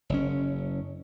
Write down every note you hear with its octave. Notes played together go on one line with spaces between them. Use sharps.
F#1 C#4